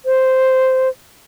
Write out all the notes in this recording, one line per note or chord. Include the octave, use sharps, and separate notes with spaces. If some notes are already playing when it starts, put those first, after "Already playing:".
C5